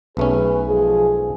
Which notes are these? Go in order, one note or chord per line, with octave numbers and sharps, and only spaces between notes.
B1 A3 C#4 G#4 B4
F3 G#3 G#4 A4